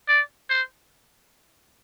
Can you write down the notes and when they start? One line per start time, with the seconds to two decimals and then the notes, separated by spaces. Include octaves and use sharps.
0.08 D5
0.50 C5